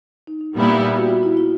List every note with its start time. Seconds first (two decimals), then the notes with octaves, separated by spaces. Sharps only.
0.27 D#4
0.41 D#4
0.55 A#2 G3 B3 E4
0.96 F#4
1.09 F4
1.23 E4
1.37 F4